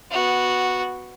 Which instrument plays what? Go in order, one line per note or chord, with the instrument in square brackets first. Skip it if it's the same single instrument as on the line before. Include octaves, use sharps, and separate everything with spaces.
[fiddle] B3 F#4